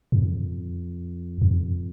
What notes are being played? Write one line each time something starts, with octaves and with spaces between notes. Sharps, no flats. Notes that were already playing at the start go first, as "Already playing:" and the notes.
G2
F2
F2